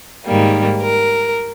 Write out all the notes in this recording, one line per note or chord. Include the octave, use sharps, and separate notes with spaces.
G#2 D#3 G3 A#3
A#4